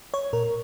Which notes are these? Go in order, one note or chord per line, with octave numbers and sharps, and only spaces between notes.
C#5
A#2 A#4